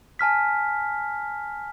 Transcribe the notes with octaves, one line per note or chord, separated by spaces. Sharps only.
G#5 A5 F6 B6